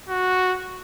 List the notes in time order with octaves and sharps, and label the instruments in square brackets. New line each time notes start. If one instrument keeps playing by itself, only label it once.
[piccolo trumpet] F#4